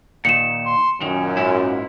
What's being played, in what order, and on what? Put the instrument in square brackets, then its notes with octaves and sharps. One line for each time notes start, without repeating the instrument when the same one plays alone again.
[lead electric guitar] A#2 D#3 [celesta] C#7 E7
[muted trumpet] C6
[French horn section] F#2 A#2 [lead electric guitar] D#3 [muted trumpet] G#5
[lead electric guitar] G#2 E4